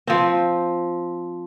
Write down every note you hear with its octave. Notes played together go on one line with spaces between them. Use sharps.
F3 C4